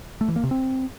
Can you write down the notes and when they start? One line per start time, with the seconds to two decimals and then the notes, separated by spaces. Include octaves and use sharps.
0.21 A3
0.28 E3
0.36 A#3
0.43 C3
0.51 C4